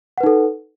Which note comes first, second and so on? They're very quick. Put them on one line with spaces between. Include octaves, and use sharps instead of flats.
F#5 B4 D#4 A4